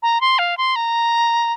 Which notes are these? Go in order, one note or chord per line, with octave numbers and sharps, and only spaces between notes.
A#5
C6
F5
C6
A#5